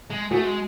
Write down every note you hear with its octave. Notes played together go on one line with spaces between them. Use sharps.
G#3
A3 F#4 G#4
G#3